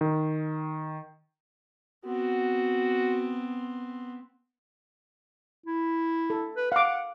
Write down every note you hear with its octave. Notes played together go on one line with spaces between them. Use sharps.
D#3
B3 C4 F#4
E4
A4
B4
F5 F#5 D6